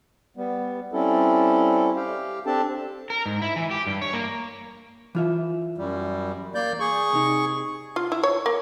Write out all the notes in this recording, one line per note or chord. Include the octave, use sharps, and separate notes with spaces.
G3 B3
G3 C4 C#4 E4 A4
G4 F5 G5
C4 D4 G4 A4 A5
A#4
G#2
E4
E3
G4
G2
C#5
A#3
E3 F4 E5
F#2 G3
A#3 D5 G6
G#4 C#6
C3 D#4
F4
E4
C#5
A#3